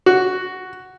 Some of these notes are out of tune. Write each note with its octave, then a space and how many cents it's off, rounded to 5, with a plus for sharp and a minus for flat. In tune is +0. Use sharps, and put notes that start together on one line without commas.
F#4 +5